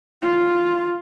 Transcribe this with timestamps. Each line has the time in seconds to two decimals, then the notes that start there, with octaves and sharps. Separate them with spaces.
0.23 F4